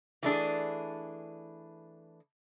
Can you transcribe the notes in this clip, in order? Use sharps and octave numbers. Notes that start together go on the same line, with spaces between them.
E3 A3 D4 G#4